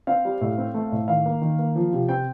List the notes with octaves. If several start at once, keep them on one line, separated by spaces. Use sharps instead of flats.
C4 F5
G3
A2
C4
A3
A2
D#3 F5
A#3
D#3
A#3
F3
C3
C4 G5